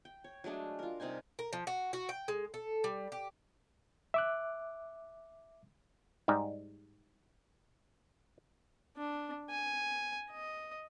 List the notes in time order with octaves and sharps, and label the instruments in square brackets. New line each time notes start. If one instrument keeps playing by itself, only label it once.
[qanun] G5
C#5
F#3 G#3 A3 D4
F4 A#4
C3 G3 D#4 G#5
[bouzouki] A#4
F3
F#4
F#4
G5
G#3
A4
G3
G4
[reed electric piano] E5 D6 F#6
[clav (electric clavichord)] G#2 G3 D#4 G4
[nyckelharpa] D4
G#5
D#5